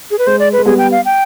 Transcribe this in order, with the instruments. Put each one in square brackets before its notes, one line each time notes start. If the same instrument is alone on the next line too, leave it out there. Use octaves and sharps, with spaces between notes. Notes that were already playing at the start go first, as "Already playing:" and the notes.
[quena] G#4
B4
[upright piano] G#3 [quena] C5
[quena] D5
B4
[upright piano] G#3
[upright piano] G3 B3 [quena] G#4
[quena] G5
F5
G5